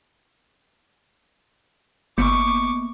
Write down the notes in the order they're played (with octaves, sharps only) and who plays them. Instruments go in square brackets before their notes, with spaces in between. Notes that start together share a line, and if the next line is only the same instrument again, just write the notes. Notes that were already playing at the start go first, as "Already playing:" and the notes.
[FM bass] G1 [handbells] A#3 B3 [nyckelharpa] C#6 D6